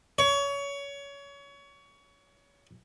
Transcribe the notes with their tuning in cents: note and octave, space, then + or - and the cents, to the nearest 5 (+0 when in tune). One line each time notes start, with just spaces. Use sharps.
C#5 +25